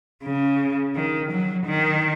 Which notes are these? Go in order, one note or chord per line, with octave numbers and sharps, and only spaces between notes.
C#3
D#3
F#3
D#3